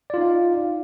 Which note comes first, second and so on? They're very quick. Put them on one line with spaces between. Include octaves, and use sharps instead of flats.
D5 F4 D#4 F5